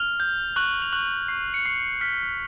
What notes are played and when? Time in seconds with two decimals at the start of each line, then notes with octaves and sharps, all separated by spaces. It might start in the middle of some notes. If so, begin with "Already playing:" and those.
Already playing: F6 F7
0.20 G6
0.56 C#6 F#6 F#7
0.82 F7
0.93 C#6 F#6 F#7
1.28 C#6 C7
1.54 C#7
1.65 C#6 C7
2.01 F6 B6